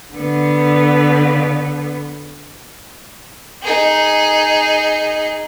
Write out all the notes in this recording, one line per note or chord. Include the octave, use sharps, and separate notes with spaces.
D3 B3
D#4 G#4